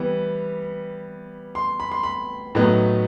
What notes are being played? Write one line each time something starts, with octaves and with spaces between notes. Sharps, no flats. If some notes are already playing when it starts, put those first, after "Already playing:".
Already playing: E3 G3 B3
C6
B5
C6
B5
A2 F#3 B3 D#4